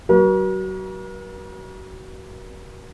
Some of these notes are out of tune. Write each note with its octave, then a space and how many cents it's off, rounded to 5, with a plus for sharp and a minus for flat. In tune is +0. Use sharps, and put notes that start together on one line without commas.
F#3 +30 A#4 +45